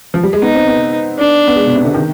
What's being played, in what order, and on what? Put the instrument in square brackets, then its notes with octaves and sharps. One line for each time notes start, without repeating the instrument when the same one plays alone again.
[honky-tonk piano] F3
G3
G#3
[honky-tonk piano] B3 [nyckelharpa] D#4
[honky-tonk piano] C4
B3
[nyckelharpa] D4
[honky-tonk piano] B3
G#3
B2
C3
D3
D#3